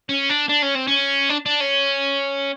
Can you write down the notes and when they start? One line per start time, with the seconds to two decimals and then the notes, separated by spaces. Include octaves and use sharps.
0.09 C#4
0.30 D4
0.49 D4
0.63 C#4
0.75 C4
0.88 C#4
1.29 D4
1.46 D4
1.60 C#4